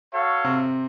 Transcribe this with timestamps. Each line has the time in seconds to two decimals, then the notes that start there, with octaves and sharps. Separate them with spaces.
0.11 F#4 A4 C#5 F5
0.44 C3 C4